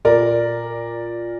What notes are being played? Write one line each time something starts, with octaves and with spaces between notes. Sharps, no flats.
A#2 A#4 D5